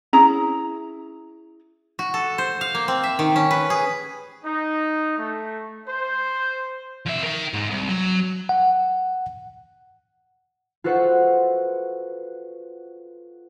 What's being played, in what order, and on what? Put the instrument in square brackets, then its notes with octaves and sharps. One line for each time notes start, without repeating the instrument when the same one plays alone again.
[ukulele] C#4 E4 G#4 A#5
[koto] F#4
A4
C5
F5
A#3
C4
E5
D#3
C#4
B4
G#4
[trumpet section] D#4
A3
C5
[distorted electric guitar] F2 E5
A#4 G5
G#2
C2
F#3
[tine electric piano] F#5
[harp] F4 F#4 A4 B4 C5 F#5